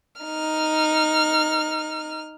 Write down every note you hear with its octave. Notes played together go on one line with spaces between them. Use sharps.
D#4 F6